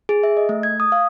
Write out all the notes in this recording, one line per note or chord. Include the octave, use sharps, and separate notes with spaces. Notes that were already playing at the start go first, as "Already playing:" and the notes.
G#4
E5
D#5
A3
G#6
D#6
F5